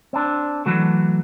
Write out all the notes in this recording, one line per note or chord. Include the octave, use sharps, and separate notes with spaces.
C4 D4
E3 F#3 A3